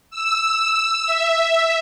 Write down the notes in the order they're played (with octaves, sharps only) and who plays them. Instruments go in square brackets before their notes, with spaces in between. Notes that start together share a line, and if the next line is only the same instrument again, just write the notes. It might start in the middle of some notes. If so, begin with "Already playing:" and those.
[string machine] E6
E5